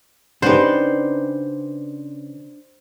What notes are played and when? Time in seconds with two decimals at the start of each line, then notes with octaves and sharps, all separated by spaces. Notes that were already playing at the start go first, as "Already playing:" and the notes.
0.42 C#3 D4 D#4 G4 B4 C5 F#5